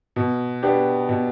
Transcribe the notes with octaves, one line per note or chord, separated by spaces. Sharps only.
B2
B3 D4 G4
B2